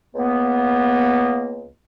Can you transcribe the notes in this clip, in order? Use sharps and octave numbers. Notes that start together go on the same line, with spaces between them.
C#2 A#3 B3